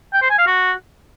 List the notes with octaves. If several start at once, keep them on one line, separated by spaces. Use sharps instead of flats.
G5
C5
G#5
F5
F#4